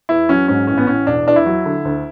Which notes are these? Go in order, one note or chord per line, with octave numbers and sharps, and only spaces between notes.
E2 E4
F#3 C#4
G#2 C#4
A1 C#4
B3
A1 C#4
E1 D4
E2 D4
E4
F#3
D3
D2